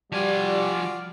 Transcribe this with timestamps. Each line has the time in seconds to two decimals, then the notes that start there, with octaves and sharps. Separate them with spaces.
0.12 F3 G3 F4 F#4 D5 G#5